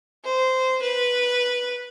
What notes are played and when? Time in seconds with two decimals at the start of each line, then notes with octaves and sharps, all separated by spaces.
0.24 C5
0.82 B4